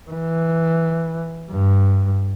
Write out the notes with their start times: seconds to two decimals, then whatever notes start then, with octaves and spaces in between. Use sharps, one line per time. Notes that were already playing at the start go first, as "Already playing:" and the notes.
0.11 E3
1.51 G2